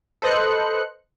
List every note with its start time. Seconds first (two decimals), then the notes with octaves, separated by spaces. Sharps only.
0.22 A4 B4 C5 D#5 F#6 C#7